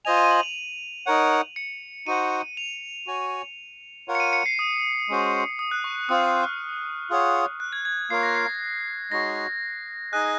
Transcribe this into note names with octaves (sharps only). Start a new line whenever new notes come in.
F4 C5 D#5 G#5 F7
D#7
F#7
F7
D#4 A#4 C#5 F#5
C#7
D#4 F#4 C5 F#5 D#7
F7
F#4 C#5 G#5
F4 A#4 C#5 F#5
C#7
D#7
C#7
C7
D#6
G#3 C#4 F#4 C5
D#6
F#6
C#6
C4 F4 C5 F5 D#6
D#6
F6
F4 G#4 C#5 F#5
F#6
G#6
G#6
A#3 F4 A#4 C#5 F5 C7
A#6
C7
G#3 D#4 F#4 C#5 A#6
D#4 G#4 D#5 G#5 F#6